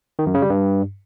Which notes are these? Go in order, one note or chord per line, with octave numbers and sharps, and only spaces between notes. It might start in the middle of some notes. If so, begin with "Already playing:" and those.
D#3
F#2
C#3
G3
G2